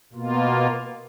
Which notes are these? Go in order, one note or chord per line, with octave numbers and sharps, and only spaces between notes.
B2 A#3 F4